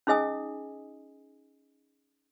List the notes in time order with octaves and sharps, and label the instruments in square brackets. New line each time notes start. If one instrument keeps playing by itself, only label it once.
[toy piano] C#4 D#4 G#4 D#5 G#5 D#6